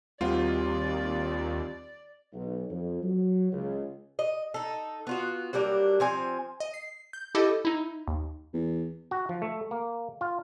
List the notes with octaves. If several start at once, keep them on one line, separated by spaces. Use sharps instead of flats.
D#2 G3 C4 F4 F#4 D5
B1
F2
F#3
C#2
D#5
D#4 A4
B3 F4 F#4
F#3 G3 A#3 D4
F3 C4 G#5
D#5
C7
G6
E4 G4 A4 D#5
D#4 E4
D#2
E2
F#4
F3
A3
A#3
F4